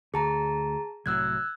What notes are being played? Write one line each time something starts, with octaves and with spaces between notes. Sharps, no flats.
D2 G#4 A5 A#5
C2 A2 F#3 E6 F#6 G#6